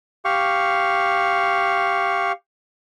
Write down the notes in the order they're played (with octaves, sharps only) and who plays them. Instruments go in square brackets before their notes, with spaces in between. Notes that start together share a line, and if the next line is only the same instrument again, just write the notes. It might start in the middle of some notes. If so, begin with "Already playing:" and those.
[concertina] G4 F5 C#6